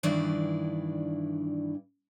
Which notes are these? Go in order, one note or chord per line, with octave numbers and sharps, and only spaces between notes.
G2 D#3 E3 D4 E4 D5